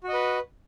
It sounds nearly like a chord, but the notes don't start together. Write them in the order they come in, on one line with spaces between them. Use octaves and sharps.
F#4 D#5 B4